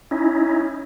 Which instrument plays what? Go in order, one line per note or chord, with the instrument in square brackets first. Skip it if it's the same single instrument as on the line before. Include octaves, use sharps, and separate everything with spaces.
[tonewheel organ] C#4 D#4 E4